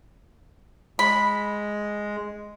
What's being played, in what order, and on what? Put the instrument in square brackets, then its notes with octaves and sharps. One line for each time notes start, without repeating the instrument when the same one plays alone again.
[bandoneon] G#3 [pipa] B5